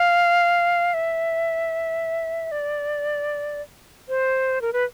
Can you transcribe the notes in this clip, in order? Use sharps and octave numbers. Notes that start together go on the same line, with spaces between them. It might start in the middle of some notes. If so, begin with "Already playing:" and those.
Already playing: F5
E5
D5
C5
A#4
B4